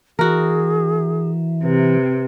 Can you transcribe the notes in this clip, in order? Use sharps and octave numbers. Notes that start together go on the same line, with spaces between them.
E3 F#4 G#4 A#4
C3 B4